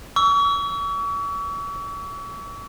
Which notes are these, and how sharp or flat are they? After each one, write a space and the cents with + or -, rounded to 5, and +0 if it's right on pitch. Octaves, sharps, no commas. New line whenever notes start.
C#6 +40 E6 +0